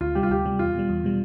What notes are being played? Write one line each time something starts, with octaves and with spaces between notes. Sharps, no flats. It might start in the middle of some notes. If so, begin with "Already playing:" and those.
D2 F4
C3 G3 G4
F4
D2 G4
C3 G3
E2 F4
B2 G3
E2
B2 G3